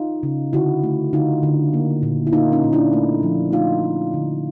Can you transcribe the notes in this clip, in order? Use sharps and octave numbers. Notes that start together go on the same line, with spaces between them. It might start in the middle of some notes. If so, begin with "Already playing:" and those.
Already playing: D#4 F4
C#3
D3 E4 F#4
A3
D3 D#4 F4
D3
A#3
A#2
E4
A#3 D#4 F4
C#4 D#4
A#2
D4 E4
A3
F3
A3 D#4 F4
A3
D3